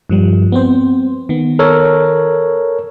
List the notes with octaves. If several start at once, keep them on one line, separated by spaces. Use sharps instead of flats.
G2 F3 G3
B3 C4 C5
D#3 B3
A4 A#4 C#5